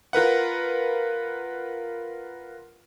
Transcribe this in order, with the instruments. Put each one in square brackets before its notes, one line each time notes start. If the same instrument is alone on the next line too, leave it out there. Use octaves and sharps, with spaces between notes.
[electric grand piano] F4 A#4 B4 F#5